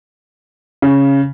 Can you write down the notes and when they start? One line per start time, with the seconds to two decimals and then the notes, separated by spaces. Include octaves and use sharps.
0.82 C#3